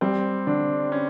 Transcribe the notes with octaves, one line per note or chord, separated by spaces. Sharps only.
G3 C4
D3 D4
C#4